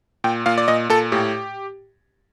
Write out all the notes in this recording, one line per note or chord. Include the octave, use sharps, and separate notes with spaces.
A#2 G5
A#2 F5
D5
A#2 D#5
A#2 A4
A2 G4